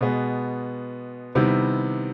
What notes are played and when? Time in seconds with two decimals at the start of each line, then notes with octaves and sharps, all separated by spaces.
0.01 B2 G#3 B3
1.35 C3 D#3 G3 B3 E4